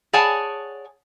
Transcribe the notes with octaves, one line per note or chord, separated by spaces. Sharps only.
G#4 C#5 D5 F#5 G#5 A5